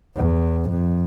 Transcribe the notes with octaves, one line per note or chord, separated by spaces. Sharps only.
E2
F2